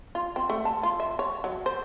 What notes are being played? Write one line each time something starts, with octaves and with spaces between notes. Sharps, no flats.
F4
C4
A3
A5
F4
E5
C#5
F#3
C5